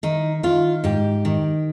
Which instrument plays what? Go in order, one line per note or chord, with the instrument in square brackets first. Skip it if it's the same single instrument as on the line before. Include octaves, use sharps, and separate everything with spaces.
[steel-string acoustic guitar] D#3 D#4
D#3 F4
G#2 G4
D#3